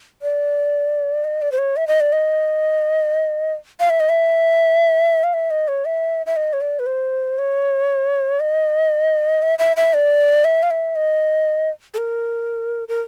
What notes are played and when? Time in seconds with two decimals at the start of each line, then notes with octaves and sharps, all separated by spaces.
0.22 D5
1.24 D#5
1.42 D5
1.52 C5
1.58 C#5
1.76 E5
1.87 D#5
2.00 D5
2.12 D#5
3.80 F5
3.90 E5
4.00 D#5
4.09 E5
5.23 F5
5.33 E5
5.50 D#5
5.68 C#5
5.85 E5
6.26 E5
6.36 D#5
6.53 C#5
6.61 D5
6.79 B4
6.86 C5
7.38 C#5
8.40 D#5
9.42 E5
9.59 E5
9.76 E5
9.94 D5
10.44 E5
10.63 F5
10.70 E5
10.96 D#5
11.94 A4
11.98 A#4
12.88 A#4